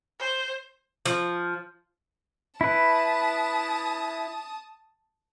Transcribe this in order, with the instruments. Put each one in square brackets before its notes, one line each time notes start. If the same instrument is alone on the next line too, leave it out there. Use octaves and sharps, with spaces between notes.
[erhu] C5
[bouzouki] F3
[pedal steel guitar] E4 B4 [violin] A5 D#6